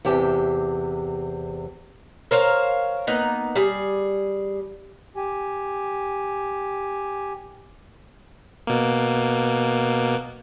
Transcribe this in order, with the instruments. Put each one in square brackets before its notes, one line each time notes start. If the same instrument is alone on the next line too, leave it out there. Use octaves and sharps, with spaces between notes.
[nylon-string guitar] E2 C3 G4 A5
[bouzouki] A#4 C5 C#5 F5
A#3 B3 D#4
G3 G#4
[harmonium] G4 G#5
[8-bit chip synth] B2 A#3